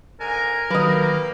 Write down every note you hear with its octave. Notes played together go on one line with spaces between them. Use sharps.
G#2 D3 A#4 G#5
D#3 F#3 G3 A#3 B4 D#5